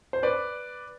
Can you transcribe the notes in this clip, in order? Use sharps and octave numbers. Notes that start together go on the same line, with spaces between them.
C5
B4 D5